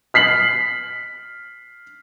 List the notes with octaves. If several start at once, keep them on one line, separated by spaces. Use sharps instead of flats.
F6 B6 C7 F#7